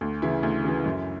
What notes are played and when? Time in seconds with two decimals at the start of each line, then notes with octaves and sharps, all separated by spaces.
0.01 D2
0.22 C#3 E3 E4
0.43 D2
0.64 C#3 E3
0.86 F#2